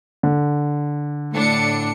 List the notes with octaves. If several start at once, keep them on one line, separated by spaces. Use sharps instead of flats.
D3
A2 D4 C#7